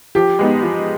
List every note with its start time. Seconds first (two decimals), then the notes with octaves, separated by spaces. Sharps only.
0.15 F3 G4
0.39 G#3 B3 D#4
0.63 F3